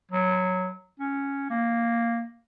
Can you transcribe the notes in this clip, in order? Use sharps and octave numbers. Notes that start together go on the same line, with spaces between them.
F#3
C#4
A#3